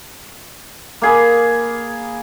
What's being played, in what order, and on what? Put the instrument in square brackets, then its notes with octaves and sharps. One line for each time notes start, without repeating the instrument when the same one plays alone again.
[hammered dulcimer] A#3 G#4 B5